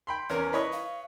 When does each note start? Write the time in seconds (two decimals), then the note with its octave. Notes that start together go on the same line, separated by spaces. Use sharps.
0.07 G5 B5 C6
0.30 E2 C#4 A#4 B4
0.53 E4 B4 C#5 D#5
0.72 F5